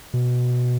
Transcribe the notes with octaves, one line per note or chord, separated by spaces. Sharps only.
B2